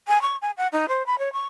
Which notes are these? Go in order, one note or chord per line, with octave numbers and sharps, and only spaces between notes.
G#5
C#6
G#5
F#5
D#4
C5
B5
C#5
C#6